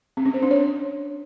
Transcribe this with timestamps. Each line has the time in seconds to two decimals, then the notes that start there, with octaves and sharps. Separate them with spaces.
0.17 C4
0.26 C#4
0.34 C5
0.42 D4
0.51 C#5